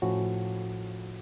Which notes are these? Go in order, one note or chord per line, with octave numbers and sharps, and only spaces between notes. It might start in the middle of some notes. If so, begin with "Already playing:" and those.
A2 F3 A3 C#4 F#4